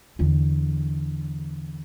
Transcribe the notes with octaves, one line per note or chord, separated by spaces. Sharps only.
E2 D3